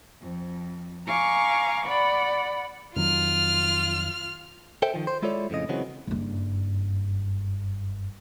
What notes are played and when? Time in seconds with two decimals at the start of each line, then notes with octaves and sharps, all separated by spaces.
0.21 F2
1.07 F5 G#5 A#5 C#6 D6
1.85 D5 F#5 B5
2.96 F2 D#3 F#3 F4 F6
4.82 A4 C5 E5 G5
4.94 D#3 F3
5.07 C5
5.22 G#3 E4 F4 A4 C#5 D5
5.50 F2 A2 C#3 D#5
5.69 C#3 E3 F#3 G#3 B3 C4
6.07 F#1 G2